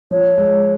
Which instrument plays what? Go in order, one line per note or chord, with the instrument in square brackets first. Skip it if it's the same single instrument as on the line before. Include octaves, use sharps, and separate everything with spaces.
[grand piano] F3 [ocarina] C#5
[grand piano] G#3